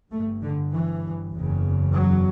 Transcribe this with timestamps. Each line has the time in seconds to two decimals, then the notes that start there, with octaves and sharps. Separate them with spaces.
0.12 G1 G2 A3
0.43 D3
0.74 E3
1.35 F#1 E2 C#3
1.95 F#3